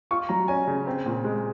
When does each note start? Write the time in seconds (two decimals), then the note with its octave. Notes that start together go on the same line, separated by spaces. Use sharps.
0.11 F4 C#6
0.29 F#3 A#5
0.48 C#4 G#5
0.67 C#3
0.87 C4
1.06 A#2
1.24 G#3